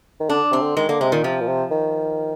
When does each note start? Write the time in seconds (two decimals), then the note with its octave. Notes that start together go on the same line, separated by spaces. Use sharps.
0.20 D#3
0.30 D3 D4
0.51 C3 C4
0.61 D3
0.77 D#3 G#3
0.89 D3 A#3
1.01 C3 G#3
1.12 A#2 D#3
1.24 C3 F3
1.41 A#2
1.47 C3
1.71 D#3